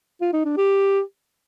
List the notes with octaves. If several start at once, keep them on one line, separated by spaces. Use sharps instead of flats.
F4
D#4
D4
G4